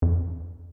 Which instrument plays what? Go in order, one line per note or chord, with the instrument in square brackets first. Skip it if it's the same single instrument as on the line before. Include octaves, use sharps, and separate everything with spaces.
[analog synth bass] F2